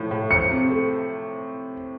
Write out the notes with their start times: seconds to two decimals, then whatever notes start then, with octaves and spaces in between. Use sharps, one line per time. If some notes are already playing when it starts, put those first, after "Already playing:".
Already playing: A2 F3
0.11 A2
0.30 F3 C#7
0.51 C3
0.70 A3